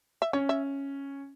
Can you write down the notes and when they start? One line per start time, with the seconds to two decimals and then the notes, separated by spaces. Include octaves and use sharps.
0.22 E5
0.33 C#4 C#5
0.49 E5